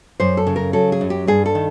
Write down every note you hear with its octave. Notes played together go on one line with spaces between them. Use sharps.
F#2 C5
A4
C#3
A#4
F#3 A4
G#4
F#2
G4
G2 G#4
A4
D#3